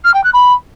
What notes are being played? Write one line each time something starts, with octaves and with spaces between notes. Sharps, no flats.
F6
G5
F#6
B5